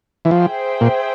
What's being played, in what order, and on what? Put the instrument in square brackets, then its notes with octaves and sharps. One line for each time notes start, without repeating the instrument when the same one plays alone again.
[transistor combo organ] E3
[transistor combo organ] F3 [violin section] G#4 C5 E5 G5
[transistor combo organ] A#2